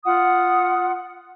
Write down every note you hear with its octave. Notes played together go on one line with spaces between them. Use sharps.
F4 F#5 D#6